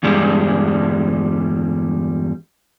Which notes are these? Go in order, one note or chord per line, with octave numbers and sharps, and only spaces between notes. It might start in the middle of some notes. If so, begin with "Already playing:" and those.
E2 G2 G3 G#3